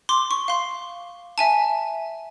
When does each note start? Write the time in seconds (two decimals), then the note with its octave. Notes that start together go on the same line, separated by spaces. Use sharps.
0.09 C6 D6
0.31 C#6
0.48 F5 C6
1.38 E5 G#5 A5